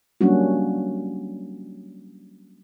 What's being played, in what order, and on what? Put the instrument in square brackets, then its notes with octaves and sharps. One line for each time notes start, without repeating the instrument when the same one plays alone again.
[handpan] F#3 G3 A#3 C#4 D4 F#4